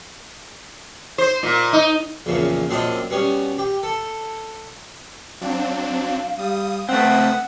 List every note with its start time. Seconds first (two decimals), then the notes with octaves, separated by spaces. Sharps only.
1.18 C5
1.43 A#2
1.73 D#4
2.26 A#1 E2 A#2 C#3
2.69 A#1 F#2 C4 D4 F4 D#5
3.10 B2 G3 C#4
3.59 G4
3.83 A4
5.41 F#3 C4 D4 F5
6.39 G3 D#6
6.89 A3 C4 B4 F#5 D#6 E6